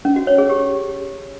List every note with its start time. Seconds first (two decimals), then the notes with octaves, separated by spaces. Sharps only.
0.05 C#4
0.16 F#4
0.27 C#5
0.38 G#4
0.49 G4